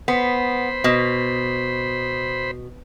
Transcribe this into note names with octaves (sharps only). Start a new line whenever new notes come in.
B3 C5 B5
B2